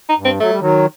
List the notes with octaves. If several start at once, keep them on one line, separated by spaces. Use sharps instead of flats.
D#4
G2
C4
F#3 A3
G3
D#3 F#3